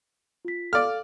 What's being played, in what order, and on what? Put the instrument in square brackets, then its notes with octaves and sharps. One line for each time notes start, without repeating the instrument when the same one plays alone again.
[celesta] F4 B6
[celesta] A4 F5 [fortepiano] D5 F6